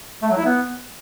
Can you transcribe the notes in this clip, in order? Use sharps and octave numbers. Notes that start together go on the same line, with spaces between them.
A3
F#3
E4
B3